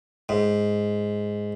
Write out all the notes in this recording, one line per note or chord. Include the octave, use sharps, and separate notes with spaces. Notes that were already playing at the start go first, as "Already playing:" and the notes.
G#2